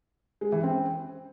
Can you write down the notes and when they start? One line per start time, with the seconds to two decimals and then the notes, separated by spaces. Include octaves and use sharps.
0.41 G#3
0.52 E3
0.63 C4